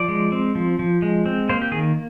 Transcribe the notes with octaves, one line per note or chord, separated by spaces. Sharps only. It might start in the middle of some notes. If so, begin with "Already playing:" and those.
Already playing: F3 D5
G#3
C4
F3
F3
G#3
C4
A#3 C5
G4
D#3 G#4